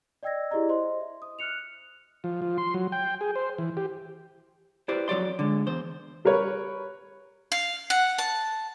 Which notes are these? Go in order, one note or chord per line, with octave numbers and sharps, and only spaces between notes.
D5 D#5 G5 E6 G#6 A#6
E4 G4 G#4 D5 D#5 A#5
C5 D#5 C6
E5
D#6
F6 F#6 C#7 F7
F3
F3
C6
F#3
G5
G#4
C5
E3
G4
E4 G4 B4 C5 D5
F2 F#3 C#5 D5 C6
D3 G#3
E2 C5
G3 A#4 B4 C#5
F5
F#5
A5